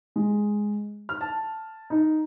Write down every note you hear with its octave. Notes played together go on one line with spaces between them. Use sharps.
G#3
F6
A5
D#4